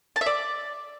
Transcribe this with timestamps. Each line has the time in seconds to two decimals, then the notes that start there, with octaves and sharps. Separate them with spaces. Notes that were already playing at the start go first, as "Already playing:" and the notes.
0.16 A5
0.21 E5
0.26 D5